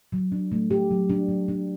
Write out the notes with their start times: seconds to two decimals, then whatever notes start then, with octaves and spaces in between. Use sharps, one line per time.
0.12 F#3
0.32 D4
0.52 A3
0.71 G4
0.91 F#3
1.10 D4
1.29 F#3
1.48 D4